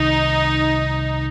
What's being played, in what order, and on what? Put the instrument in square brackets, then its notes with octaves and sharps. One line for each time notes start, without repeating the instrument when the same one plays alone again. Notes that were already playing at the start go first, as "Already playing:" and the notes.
Already playing: [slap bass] C2 C3 D#3 [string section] D#4